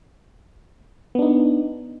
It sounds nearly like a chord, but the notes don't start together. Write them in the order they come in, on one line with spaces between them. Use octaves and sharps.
B3 D4 D#4